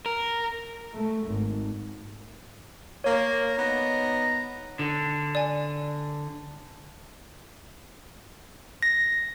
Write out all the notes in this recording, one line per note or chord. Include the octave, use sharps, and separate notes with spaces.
A#4
A3
G#1
A#3 C#5
B3 D#4 A#5
D3
D5 G#5
A#6